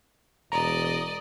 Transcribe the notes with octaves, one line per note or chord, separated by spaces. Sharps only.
E1 D5 D#5 A#5